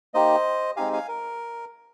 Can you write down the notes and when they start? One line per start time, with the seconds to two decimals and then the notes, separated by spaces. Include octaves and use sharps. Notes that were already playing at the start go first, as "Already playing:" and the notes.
0.14 A#3 D#4 G4 C5 D#5
0.76 G#3 C4 D#4 G4 F5 G#5
0.93 F5 G#5
1.08 A#4